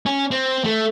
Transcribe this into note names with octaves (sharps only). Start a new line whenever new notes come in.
C#4
C4
A3